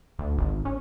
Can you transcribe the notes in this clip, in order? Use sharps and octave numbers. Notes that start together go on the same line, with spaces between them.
D2
G#1
C#4